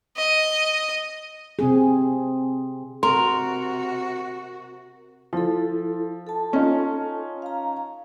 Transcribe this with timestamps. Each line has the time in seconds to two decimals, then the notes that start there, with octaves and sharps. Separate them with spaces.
0.16 D#5
1.59 C3 C4 G#4
3.03 C3 F#4 A#4 C6
5.33 F3 E4 A4
6.27 A4 A5
6.53 C#4 D#4 F4
7.42 F5 A#5